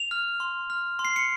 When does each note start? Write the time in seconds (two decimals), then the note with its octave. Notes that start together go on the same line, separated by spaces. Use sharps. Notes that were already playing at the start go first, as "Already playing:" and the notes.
Already playing: F7
0.11 F6
0.40 C6
0.70 F6
0.99 C6
1.05 C7
1.16 C#7